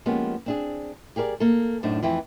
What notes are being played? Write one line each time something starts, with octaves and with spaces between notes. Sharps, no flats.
F3 G#3 A#3 B3 C#4 G4
C4 D4 G#4
G4 G#4 A#4 C5 D5
A#3 A4
F#2 A2 D4 D#4 C5 D#5
F2 E3 E4 G5